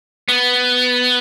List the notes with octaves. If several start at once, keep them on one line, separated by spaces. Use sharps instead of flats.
B3